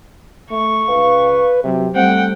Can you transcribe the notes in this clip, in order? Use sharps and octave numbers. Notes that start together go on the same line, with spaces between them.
A3 C#6
C#2 B4 F5
C3 F#3 C4 G4
G3 A3 C4 F#5 G5